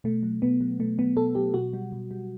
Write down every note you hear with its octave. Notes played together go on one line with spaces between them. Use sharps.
B2 A3
F#3
B2 B3
F#3
B2 A3
F#3 B3
B2 A4
F#3 G4
B2 F#4
G3
B2
G3